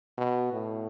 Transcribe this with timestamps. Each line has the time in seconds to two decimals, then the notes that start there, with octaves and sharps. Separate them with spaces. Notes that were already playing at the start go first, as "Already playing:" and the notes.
0.18 B2
0.53 A2